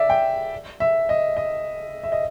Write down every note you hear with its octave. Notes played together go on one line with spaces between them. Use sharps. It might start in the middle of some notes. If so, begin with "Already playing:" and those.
Already playing: D5 E5
G5
E5
D#5
D#5
E5
D#5